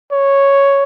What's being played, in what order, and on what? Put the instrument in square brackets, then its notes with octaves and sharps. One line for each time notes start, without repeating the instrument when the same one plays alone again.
[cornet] C#5